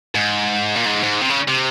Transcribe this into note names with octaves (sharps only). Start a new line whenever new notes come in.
G#2
A#2
G#2
G#2
C3
C#3
C3